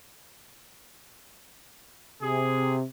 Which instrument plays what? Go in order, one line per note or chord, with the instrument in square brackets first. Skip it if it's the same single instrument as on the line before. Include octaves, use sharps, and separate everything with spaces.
[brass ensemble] C3 [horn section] G#4